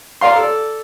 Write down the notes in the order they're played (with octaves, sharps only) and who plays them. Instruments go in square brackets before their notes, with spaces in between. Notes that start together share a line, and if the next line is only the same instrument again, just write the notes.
[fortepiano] A#4 D5 F5 C6
A4 D5